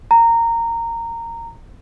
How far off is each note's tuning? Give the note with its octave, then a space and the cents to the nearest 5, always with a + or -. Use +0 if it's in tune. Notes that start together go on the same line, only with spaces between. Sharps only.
A#5 -15